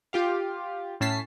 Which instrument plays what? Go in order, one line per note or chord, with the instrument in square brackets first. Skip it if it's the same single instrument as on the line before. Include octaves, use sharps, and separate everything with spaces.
[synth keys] F4 G4 F5
A2 C#4 A5 B6 C7